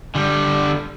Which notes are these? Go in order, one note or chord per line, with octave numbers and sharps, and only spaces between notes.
D3 G3